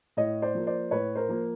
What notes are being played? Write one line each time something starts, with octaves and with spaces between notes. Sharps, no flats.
A2 C#5 D#5
C5 D5
F3 A#3
C5 D5
A2 B4 C#5
A#4 C5
F3 A#3